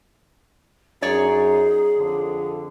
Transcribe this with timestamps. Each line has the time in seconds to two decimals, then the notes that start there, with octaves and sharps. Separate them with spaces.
1.02 F#2 D#4 G#4 C#5 D5
1.98 F2 D3